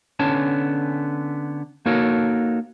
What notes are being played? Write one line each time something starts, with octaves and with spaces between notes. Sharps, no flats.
D3 B3 C#4 C#5 A5
A#3 D#4 F#4 A4 A#4 C#5